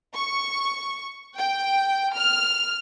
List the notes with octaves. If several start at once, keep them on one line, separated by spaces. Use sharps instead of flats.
C#6
G5
F6